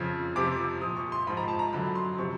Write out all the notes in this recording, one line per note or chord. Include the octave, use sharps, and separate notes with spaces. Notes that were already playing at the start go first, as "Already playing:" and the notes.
Already playing: F2 C#3 F3
F2 C3 F3 D6
A#2 F3 D#6
C#6
C6
G#2 F3 B5
A#5
A5
A#5
F#2 D3 F#3 B5
C6
C3 F3 C#6